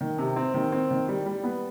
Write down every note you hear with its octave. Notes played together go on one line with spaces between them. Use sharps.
D#3
C3
C4
D#3
C4
D#3
G3
G3
B3